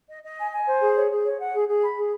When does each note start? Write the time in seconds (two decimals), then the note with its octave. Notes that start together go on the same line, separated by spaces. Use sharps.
0.09 D#5
0.23 D#5
0.38 G#5
0.51 G#5
0.66 C5
0.80 G#4
0.96 C#5
1.10 G#4
1.25 C#5
1.39 F#5
1.53 G#4
1.67 G#4
1.82 B5
1.96 G#4